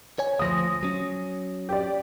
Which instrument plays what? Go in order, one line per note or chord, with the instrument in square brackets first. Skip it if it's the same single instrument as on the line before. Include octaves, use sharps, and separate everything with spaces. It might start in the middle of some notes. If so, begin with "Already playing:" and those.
[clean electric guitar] C#5 G#5
[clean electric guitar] D2 F3 C5 [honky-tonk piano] D#6 A#6
[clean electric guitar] F#3 C#4
[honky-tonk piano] G4 D5